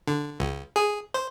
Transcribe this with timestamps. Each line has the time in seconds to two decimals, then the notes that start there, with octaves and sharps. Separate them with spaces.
0.07 D3
0.40 C#2
0.76 G#4
1.14 C5